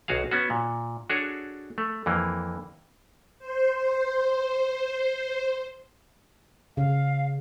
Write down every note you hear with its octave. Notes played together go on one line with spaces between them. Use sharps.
B1 F#4 G#4 F5
B3 C#4 F#4
A#2
D4 F#4 G#4 A4 C#5
A3
F2 E3 A#3
C5
C5
C#3 F5